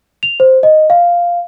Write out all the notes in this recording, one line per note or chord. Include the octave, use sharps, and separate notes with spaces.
F7
C5
D#5
F5